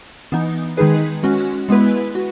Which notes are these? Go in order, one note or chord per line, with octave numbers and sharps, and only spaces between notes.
E3 B3 D#4
D#3 G#3 D#4 G#4 B4
G#3 C#4 F#4
G#3 B3 E4 B4
F#4